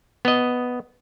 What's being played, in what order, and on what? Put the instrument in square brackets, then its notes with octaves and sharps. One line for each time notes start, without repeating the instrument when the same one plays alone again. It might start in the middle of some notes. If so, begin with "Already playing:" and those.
[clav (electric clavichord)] B3 D#5